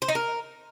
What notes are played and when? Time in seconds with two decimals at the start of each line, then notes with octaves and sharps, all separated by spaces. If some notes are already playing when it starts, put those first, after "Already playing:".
0.02 C5
0.08 D#4
0.15 A#4